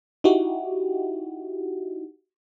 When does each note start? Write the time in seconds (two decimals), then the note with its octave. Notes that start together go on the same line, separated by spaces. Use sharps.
0.24 D#4 E4 F#4 G4